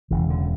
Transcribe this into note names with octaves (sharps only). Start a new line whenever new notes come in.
E1 D2 C#3 E3
D3